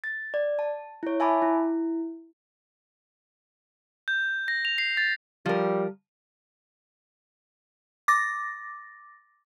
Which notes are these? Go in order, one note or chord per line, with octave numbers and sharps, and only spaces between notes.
A6
D5
A5
E4 C#5
E5 G#5 A5 B5 D6
E4
G6
A#6
F7
C7
A6
F3 G3 A#4
D6 A6 A#6